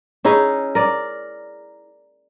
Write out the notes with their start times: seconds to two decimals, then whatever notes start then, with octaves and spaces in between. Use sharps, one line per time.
0.25 C#4 D#4 E4 G#4
0.75 A#4 D5